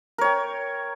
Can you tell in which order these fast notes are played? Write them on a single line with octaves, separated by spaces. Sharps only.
A#4 C#5 G5